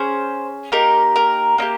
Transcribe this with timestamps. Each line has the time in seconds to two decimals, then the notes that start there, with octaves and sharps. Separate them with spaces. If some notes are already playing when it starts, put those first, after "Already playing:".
Already playing: C#4 G#4 C5
0.72 A#3 D#4 G4 A#4
1.16 A#4
1.58 A#3 D#4 G4